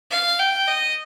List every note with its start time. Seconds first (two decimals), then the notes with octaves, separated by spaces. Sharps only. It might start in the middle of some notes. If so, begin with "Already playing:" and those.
0.11 F5
0.39 G5
0.68 D#5